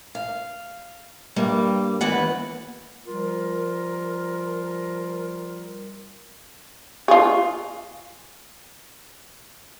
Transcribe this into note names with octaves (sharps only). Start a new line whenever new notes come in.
F5
G2 G3 A#3
D#2 E3 B3 F#5
F3 G3 F4 A#4
F4 G#4